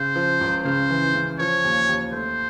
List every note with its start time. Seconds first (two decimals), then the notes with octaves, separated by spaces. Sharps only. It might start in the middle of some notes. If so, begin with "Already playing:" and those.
Already playing: C#3 C5
0.16 F3
0.41 C#2
0.65 C#3 C5
0.90 E3
1.14 C#3
1.39 F3 C#5
1.64 D#2
1.89 D#2
2.13 A3 C5